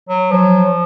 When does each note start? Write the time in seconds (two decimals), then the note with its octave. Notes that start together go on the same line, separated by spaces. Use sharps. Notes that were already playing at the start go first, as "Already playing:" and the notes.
0.09 F#3
0.31 F3 F#3